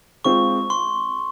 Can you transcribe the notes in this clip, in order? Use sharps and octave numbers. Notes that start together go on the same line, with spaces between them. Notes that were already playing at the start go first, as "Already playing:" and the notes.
G#3 C4 F4 C#6
C6